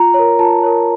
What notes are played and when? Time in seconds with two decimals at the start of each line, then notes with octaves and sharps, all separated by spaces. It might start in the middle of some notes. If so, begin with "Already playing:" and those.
Already playing: F4 A#5
0.14 A#4 C#5
0.39 F4 A5
0.63 A#4 C#5